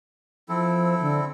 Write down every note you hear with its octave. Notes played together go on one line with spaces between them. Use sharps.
F3 C4 E4 A4
D3